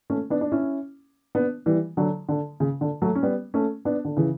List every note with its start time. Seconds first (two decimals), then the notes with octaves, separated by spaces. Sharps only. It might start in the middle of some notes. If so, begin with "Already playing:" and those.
0.10 A3 C#4
0.30 B3 D4
0.41 D4
0.52 C#4 E4
1.35 B3 D4
1.66 E3 G3
1.97 D3 F#3
2.29 D3
2.60 C#3
2.81 D3
3.02 F#3 A3
3.15 C#4
3.23 G3 B3
3.54 A3 C#4
3.85 B3 D4
4.05 D3
4.17 C#3 E3